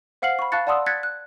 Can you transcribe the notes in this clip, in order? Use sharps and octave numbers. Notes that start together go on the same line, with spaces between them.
C5 F5 F#5 F6 C7 F#7
B5 C#6
F5 A5 C#6 F#6 A6 C#7
D5 F#5 A5 C6 D#6 E6
F#6 G#6 A6 B6 C#7
F#6